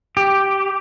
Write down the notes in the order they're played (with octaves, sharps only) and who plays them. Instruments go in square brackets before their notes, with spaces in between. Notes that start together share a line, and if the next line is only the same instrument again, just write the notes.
[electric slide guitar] G4